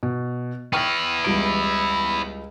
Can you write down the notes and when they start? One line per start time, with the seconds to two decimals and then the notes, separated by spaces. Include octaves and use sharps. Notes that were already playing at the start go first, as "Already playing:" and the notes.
0.03 B2
0.73 B3 E4 G5 C#6 F6
1.25 C#2 G3 D7